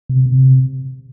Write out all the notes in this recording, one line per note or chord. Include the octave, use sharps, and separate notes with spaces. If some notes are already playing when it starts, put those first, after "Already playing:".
C3
C3